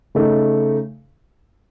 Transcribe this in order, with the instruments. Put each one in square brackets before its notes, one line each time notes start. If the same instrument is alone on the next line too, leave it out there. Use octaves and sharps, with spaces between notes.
[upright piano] C#3 A3 D#4